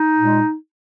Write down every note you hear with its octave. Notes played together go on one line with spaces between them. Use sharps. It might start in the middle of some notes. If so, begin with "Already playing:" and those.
Already playing: D#4
A#2 G#3